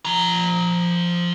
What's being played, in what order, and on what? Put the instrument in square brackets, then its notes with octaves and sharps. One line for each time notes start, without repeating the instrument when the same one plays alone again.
[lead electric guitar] F3 A#5